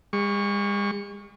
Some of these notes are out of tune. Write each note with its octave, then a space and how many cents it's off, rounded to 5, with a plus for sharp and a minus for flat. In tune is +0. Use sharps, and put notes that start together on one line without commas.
G#3 -45 C#6 +0